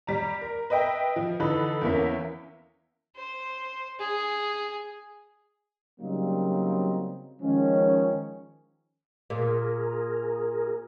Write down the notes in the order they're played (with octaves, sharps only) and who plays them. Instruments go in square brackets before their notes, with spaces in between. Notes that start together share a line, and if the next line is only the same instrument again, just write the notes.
[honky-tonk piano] G3 A#5
A#4
B4 D#5 E5 G5
F3
D3 E3 D#4 A4 B5
E2 A#3 C#4 E5
[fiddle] C5
G#4
[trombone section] C#3 F#3 G3 A#3 C4 D#4
D#3 F3 G#3 C#4
[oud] A#2 [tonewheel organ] G#4 A#4